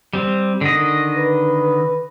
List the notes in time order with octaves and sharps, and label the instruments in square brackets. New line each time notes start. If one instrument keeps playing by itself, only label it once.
[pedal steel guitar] G3 C4
D3 D#3 D#5
[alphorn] B4